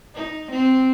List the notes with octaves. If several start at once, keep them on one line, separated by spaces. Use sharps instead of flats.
D#4
C4